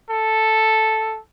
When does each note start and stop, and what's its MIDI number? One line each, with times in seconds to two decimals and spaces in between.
0.11 1.18 69